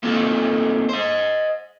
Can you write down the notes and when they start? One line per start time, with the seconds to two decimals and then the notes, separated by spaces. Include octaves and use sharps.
0.03 A3 A#3 C4 D#4 F4 A4
0.89 C5 D#5